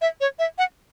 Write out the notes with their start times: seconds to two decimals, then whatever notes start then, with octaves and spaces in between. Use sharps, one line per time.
0.01 E5
0.21 C#5
0.39 E5
0.58 F#5